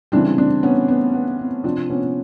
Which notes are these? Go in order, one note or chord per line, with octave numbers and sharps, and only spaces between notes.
C#3 E3 G3 C4 D4
C4 D4
B3 C#4
B3
B3
C4
C3 F3 C4 D4
B3 C#4